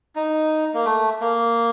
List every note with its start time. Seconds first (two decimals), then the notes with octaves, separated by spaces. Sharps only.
0.16 D#4
0.74 A#3
0.85 A3
1.21 A#3